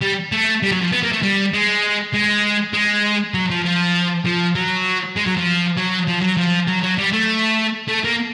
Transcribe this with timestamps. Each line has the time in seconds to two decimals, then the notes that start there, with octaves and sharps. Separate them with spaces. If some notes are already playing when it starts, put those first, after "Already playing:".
0.01 G3
0.32 A3
0.63 G3
0.72 F#3
0.82 F3
0.92 B3
1.03 A#3
1.12 A3
1.22 G3
1.53 G#3
2.14 G#3
2.73 G#3
3.34 F#3
3.50 F3
3.65 F3
4.25 F3
4.55 F#3
5.16 G#3
5.26 F#3
5.37 F3
5.77 F#3
6.07 F3
6.22 F#3
6.37 F3
6.68 F#3
6.83 F#3
6.98 G3
7.13 A3
7.88 A3
8.04 A#3